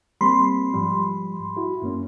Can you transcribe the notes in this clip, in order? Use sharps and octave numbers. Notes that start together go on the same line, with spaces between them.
G3 A#3 C4 B5 C6
G#2 F3 G3
E4 F#4
F#2 A#3 C#4